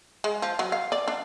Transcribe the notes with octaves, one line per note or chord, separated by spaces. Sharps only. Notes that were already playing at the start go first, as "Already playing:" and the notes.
G#3
F3
F#3
F5
D5
D4